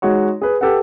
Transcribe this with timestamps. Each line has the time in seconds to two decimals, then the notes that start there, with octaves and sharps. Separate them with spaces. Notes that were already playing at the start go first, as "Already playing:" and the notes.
0.02 G#3 D#4 F#4 C#5
0.42 G#4 B4
0.61 G4 A4 B4 F#5